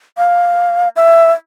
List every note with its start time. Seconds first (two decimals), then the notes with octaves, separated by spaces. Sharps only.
0.18 F5
0.96 E5